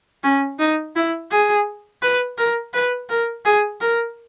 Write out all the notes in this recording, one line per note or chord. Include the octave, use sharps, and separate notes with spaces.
C#4
D#4
E4
G#4
B4
A#4
B4
A#4
G#4
A#4